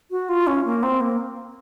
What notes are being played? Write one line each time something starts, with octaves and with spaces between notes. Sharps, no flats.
F#4
F4
C#4
A#3
C4
A#3